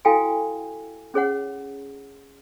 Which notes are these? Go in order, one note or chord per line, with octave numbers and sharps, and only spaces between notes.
E4 F#4 A4 F5 G5 G#5
C#4 G#4 C#5 F#5